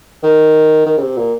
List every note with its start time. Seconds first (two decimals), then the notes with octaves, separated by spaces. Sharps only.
0.23 D#3
0.86 D#3
0.97 C#3
1.02 C3
1.17 A#2